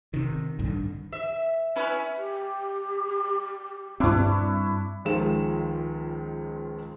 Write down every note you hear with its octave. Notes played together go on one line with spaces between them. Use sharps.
C3 D#3
A1 G2 D3 D#3
E5
C#4 E4 B4
G4
G2 C4 D4 E4 C#5
C#2 D#3 F3 G#3 F4 E7